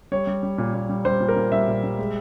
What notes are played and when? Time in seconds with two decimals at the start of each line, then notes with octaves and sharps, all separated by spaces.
0.12 G3 C#5
0.27 G3
0.43 G3
0.58 A#2
0.74 A#2
0.89 G3
1.05 G3 C5
1.20 A#2
1.29 A#4
1.36 A#2
1.52 G3 E5
1.67 A#2
1.83 G3
1.99 G#3